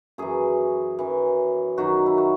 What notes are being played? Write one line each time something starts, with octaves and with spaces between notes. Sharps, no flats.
F#2 E3 G#4
F#2 E3
F#2 D#3 F#3 F#4
E4
F#4